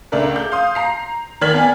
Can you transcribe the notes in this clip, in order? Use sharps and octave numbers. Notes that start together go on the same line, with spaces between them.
C#2 A3 D4 A#4
G6
F5 C6 D#6
A#5 C7
D#3 D5 F6 G#6 B6 F#7
B3 D5 G#5